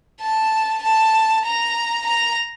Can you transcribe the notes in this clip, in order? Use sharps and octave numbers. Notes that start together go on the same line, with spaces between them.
A5
A5
A#5
A#5